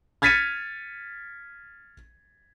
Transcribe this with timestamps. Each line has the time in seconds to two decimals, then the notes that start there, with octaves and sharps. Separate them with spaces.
0.22 F6 G#6 A6 B6 C#7 D#7